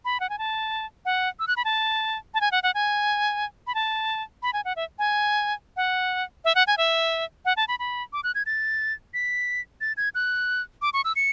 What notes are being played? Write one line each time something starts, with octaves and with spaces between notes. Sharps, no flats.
B5
F#5
G#5
A5
F#5
E6
F#6
B5
A5
A5
G#5
F#5
F#5
G#5
B5
A5
B5
G#5
F#5
E5
G#5
F#5
E5
F#5
G#5
E5
F#5
A5
B5
B5
D6
F#6
G#6
A6
B6
A6
G#6
F#6
D6
C#6
E6
C#7